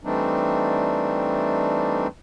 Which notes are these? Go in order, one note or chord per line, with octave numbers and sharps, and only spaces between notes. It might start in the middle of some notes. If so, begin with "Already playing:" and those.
E3 G3 A3 C4 D4 D#4